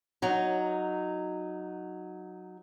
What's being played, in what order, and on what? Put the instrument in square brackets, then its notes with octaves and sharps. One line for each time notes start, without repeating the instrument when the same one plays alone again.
[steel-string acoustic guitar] F#3 D#4